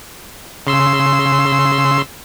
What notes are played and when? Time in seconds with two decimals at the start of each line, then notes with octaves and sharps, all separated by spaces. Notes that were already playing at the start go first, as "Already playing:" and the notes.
0.67 C#3 C6 E6